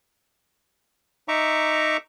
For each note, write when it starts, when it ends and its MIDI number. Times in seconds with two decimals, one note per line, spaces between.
1.28 1.97 63
1.28 1.97 76
1.28 1.97 82
1.28 1.97 85
1.28 1.97 86